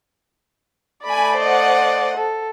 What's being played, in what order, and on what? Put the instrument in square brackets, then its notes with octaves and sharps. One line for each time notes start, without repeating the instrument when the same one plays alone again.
[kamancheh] A3 D5 [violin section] G#5 B5
[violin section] C5 D#5 F#5
[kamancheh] A4